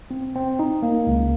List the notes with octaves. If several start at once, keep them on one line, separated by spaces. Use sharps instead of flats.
C4
C4
D#4
A#3
C#2